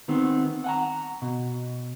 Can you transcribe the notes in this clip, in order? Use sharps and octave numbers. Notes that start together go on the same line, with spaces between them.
D#3 B3 C4
F#5 G#5 A#5
B2